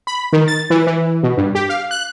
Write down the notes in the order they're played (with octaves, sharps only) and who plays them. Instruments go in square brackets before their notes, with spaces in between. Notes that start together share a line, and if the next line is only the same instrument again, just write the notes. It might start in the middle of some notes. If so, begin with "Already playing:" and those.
[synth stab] B5
D#3
A6
E3
E3
B2
G2
G4
F5
F#6